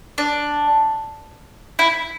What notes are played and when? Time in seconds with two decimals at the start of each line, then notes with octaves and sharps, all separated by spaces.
0.18 D4
1.79 E4